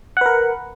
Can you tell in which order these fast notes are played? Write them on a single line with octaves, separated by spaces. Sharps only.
F#5 B4 A#4